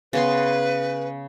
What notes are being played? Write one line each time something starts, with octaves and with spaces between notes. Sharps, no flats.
C#3 B3 B4 C6